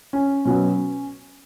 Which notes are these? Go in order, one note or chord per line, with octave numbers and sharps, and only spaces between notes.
C#4
B2 F#3 B3 C#4